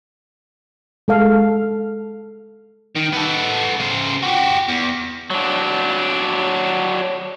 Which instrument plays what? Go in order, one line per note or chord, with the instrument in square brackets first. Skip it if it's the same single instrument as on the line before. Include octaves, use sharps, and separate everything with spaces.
[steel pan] G#3 A4 F5
[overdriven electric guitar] D#3
B3 A4
C#3 C5
F#4 G4
E2
[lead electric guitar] F#3 D4